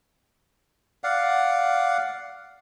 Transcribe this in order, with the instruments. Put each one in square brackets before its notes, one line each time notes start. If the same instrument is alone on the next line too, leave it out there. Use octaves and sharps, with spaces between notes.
[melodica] D5 F5 F#5